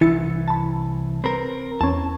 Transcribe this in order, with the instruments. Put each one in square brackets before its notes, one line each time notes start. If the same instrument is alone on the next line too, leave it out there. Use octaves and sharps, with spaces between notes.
[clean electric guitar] C2 E3 [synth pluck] E4 A6 C#7
[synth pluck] A5 B5
[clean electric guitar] C4 A#4 [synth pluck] B4
[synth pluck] E2 C#4 [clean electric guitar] A5